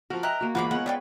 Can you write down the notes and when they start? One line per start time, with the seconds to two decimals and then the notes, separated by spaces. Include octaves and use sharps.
0.10 F3 F#4 A#4
0.23 D#5 E5 G5 A#5 F#6
0.41 A#3 F#4
0.55 E2 G#3 A#3 F4 F#4 C5 B5 D6
0.71 G#3 B3 C#5 F#5
0.86 C4 C#4 B4 D5 G5